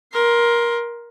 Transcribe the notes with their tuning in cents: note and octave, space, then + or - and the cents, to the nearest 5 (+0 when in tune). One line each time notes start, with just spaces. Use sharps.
A#4 +20 C6 +0